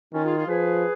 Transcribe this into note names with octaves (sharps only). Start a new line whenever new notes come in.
D#3 C#4 F4
F4 G#4
F4 G#4
F3 G#4 B4